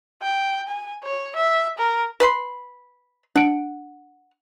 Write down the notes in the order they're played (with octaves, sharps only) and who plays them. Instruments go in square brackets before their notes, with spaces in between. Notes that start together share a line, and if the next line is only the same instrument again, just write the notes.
[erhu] G5
G#5
C#5
E5
A#4
[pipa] B4 B5 C6
[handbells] D4 D7 [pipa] F#5